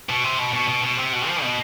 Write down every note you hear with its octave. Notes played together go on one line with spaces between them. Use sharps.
B2
C3
B2
B2
B2
B2
C3
B2
F3
B2